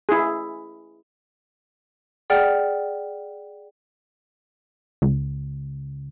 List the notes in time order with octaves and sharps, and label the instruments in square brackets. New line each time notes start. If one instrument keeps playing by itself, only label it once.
[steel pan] E4 G#4
[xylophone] G#4 D5 F#5 G5 F6
[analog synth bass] C#2